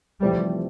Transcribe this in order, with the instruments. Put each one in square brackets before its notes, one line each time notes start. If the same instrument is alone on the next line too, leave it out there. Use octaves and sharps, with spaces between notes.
[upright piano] F1 F2 E3 A3 C4 [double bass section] G3